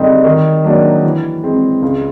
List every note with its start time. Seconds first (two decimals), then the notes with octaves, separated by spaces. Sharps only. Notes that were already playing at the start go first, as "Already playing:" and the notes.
Already playing: G2 D3 G3 C4 D#4
0.24 D#3
0.64 F#3 A#3 D4
1.04 E3
1.43 G#3 C4
1.82 C#2